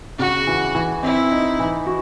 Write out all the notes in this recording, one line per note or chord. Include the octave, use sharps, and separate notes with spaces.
C#3 F#4
E3
E3
C4 E4
D#4
E3
F#4